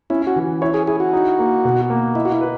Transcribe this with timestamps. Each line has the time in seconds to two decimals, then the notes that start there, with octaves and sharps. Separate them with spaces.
0.10 C#4 E4
0.27 F#4
0.36 E3
0.62 E4 C#5
0.74 G#4
0.87 E4 G#4
1.00 F#4
1.13 D#4
1.39 A#3
1.65 B2
1.90 A#3
2.15 E4 D#5
2.25 F#4
2.32 E4
2.41 B4